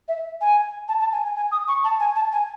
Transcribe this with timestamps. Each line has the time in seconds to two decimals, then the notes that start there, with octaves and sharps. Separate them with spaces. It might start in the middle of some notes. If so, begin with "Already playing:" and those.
0.08 E5
0.41 G#5
0.88 A5
1.00 A5
1.12 G#5
1.25 G#5
1.36 G#5
1.52 D#6
1.68 C#6
1.84 A5
2.00 G#5
2.16 A5
2.32 G#5